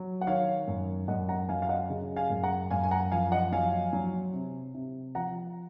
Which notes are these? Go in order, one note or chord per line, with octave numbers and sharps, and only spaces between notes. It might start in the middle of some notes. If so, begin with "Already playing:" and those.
Already playing: F#3
F#5
D#3 C#5 F5
F#2
F#2 D#5 F#5
F#5 A#5
F#3 F5 G#5
F5
D#5 F#5
C#3
F5 G#5
F#2
F#5 A#5
F#2 F5 G#5
G#5
F#5 A#5
F3 F5 G#5
D#5 F#5
F#3 F5 G#5
F#3
C3
C3
F3 F#5 A#5